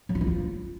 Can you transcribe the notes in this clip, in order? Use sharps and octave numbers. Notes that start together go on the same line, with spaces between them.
F#3
F4
D#4
F4